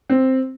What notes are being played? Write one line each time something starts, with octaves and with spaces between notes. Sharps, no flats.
C4